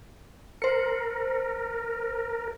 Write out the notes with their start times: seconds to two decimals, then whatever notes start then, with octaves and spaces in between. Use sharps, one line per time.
0.62 A#4 C5 C#7